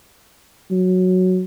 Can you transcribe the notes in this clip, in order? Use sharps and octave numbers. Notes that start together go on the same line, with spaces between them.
F#3